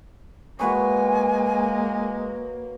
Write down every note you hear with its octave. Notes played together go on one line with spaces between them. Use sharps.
G#3 A#3 F#4 B4 C#5 G#5